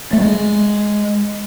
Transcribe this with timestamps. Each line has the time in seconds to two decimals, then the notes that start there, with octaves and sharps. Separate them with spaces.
0.13 A3
0.21 G#3